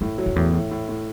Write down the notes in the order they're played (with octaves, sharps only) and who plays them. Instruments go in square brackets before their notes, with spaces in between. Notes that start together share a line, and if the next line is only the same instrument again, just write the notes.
[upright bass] F#2 [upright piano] A2
[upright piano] F#3
[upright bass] F#2
[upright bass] E2 [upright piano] A2
[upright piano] A2
A2
A2